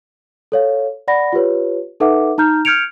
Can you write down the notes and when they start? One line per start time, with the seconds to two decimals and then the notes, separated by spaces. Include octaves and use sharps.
0.52 A4 C#5 F5
1.08 D5 F#5 B5 A#6
1.33 F4 G4 B4 C#5
2.00 D#4 A4 B4 E5 F#5 D6
2.38 D#4 A#5 F6 G6
2.65 F6 G6 G#6 C#7 D7 F7